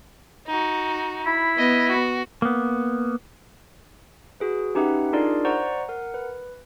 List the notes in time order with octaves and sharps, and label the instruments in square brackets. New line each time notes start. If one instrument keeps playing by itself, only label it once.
[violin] D#4 F#4
[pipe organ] E4 [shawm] B5
[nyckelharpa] B3 [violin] D#5
[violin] F#4
[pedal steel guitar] A#3 B3
[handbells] F#4 G#4 B4
C#4 D#4 G4 B4 E5 F#5
D4 D#4 F4 G#4 A#4 D5
C5 D5 F#5 A#5 C#6 G6
A#4 F#5
B4